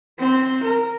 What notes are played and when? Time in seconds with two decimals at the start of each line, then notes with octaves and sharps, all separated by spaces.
0.19 C4
0.64 A#4